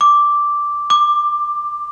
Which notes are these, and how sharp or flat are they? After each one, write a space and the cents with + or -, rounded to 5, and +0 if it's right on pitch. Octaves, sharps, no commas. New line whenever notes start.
D6 -5
D6 +15